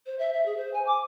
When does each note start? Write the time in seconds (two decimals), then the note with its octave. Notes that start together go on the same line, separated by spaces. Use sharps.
0.06 C5
0.19 E5
0.34 E5
0.46 G#4
0.57 C5
0.74 G#5
0.87 D6